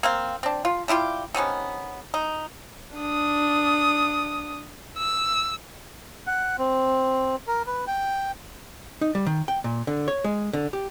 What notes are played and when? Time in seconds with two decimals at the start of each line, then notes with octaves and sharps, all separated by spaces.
0.03 A#3 C4 F5
0.43 C4 D4
0.65 F4
0.88 G3 E4 F4 G4
1.34 C3 D#3 B3 C#4
2.14 D#4
2.97 D4 D#6
4.98 E6
6.27 F#5
6.58 C4
7.47 A#4
7.67 B4
7.87 G5
9.01 D#4
9.15 G3
9.26 D#3
9.48 G5
9.64 A#2
9.87 D3
10.08 C#5
10.24 G#3
10.53 D3
10.73 G4